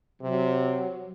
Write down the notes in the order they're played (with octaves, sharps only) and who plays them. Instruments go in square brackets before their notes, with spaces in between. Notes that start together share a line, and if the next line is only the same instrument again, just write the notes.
[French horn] C3 [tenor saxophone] F#3